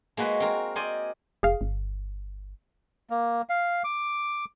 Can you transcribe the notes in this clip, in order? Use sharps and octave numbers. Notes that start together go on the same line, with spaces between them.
G#3 A#3 F#4 B4
C4 A#4
C5 D5 D#5 G#5
F1 G#4 F5
G1
A#3
F5
D6